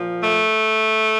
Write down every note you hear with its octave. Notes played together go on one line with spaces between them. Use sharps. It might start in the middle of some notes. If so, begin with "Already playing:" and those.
Already playing: A#2 F3
A3